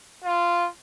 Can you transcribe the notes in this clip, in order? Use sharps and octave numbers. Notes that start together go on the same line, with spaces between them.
F4